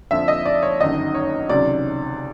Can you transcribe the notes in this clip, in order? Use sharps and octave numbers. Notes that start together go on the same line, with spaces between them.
F2 D3 F3 E5
D#5
D5
C#5
G1 F#2 D#3 D#5
C#5
C#2 C3 D#3 F#3 D5